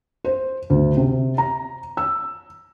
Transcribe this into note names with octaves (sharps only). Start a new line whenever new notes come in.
C5
D2
C3
A#5
E6